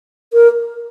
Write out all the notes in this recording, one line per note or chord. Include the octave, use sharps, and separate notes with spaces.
A#4